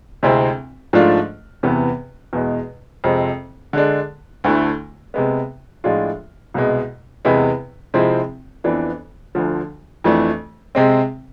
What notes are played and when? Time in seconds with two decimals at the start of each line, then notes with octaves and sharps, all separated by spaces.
0.23 D2 C3 G#3 C4 E4
0.93 G#2 F3 A3 D4 F4
1.63 E2 C3 E3 B3
2.33 E2 B2 G#3
3.04 F2 C3 G#3 C4
3.73 D3 G#3 D4
4.44 D2 D3 A3 E4
5.14 C3 G#3 B3
5.84 A2 F3 G#3 D4 F4
6.54 C2 B2 G#3
7.25 E2 C3 G#3 B3 E4
7.94 C3 F3 G#3 C4 E4
8.64 F2 E3 B3 D4
9.35 D2 D3 F3
10.04 F2 E3 A3 D4
10.75 C3 G#3 C4